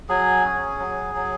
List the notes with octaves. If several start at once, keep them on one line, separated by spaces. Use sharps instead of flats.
F#3 G#4 G#5
C#4
F#3
F#3